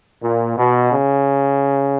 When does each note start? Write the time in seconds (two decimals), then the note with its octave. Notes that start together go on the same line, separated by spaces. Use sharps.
0.22 A#2
0.57 B2
0.92 C#3